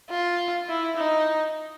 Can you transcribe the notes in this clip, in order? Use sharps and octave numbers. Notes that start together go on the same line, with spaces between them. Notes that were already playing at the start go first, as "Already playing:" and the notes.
F4
E4
D#4